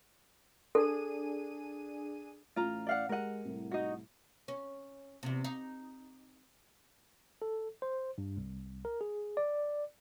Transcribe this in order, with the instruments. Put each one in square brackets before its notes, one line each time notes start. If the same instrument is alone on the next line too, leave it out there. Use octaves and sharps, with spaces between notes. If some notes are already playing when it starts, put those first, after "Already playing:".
[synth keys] D4 G#4 D#7 [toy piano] A4
[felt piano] A1 A2 C#4 [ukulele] F4 A#5
[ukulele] D5 F5 F#5
[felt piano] G#3 G4 D#7 [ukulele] A#4 F#5
[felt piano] C2 A2 C3
[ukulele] D#4 F#4
[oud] C#4
E2 C3
D#4
[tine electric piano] A4
C5
G2
C2
A#4
G#4
D5